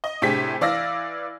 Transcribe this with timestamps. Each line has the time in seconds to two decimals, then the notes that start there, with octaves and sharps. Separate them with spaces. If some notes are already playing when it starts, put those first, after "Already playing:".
0.04 D#5
0.22 A2 C3 D4 G4 G#4 B6
0.61 E3 D5 F5 E6 A#6